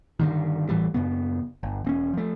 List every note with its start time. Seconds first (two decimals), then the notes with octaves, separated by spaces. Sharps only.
0.20 G2 D3 D#3
0.69 A1 A2 E3 G3
0.94 F#2 C#3 B3
1.63 G1
1.84 E1 C4 C#4
2.14 F3 A3